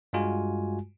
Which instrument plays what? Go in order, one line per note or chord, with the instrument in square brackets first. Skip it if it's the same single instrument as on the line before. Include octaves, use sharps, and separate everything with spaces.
[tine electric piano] G2 G3 G#3 F4 F#4 G#5